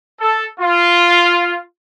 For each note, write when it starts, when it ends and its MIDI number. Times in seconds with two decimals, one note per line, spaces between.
0.20 0.44 69
0.60 1.58 65